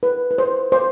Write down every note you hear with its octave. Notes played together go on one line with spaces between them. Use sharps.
B4
B4
C5
C5